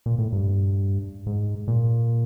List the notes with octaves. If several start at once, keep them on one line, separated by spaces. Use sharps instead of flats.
A#2
A2
G2
G#2
A#2